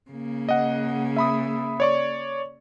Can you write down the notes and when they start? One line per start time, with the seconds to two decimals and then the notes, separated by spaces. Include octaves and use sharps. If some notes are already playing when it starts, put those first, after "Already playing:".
0.11 C#3 A#3
0.49 D#5 F#5
1.17 E5 B5 D#6
1.80 C#5 D5 C#6